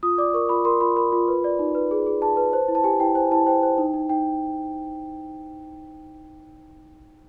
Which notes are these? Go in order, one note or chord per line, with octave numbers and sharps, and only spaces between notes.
F4 D#6
D5 D6
A#4 C#6
F4 B5
A#4 C6
F4 B5
A#4 B5
F4
B4
D5
D#4
B4
G#4
G#4
G#4 A5
B4
C5
E4
A5
G4 G#5
E4 G5
C5 G#5
E4 A5
C5 G5
C5
D#4
D#4
D#4 G5